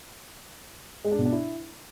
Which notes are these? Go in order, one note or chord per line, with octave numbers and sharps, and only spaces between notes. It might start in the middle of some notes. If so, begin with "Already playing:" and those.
G#3
D4
B2
D4
E4